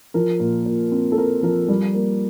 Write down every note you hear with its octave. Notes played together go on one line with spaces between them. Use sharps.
F3 A#4
A#2
A#2
C4
A4
C4 A#4
F3 A#4
G3
A#3